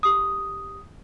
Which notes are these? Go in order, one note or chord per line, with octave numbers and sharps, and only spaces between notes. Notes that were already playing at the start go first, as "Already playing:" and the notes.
G4 D#6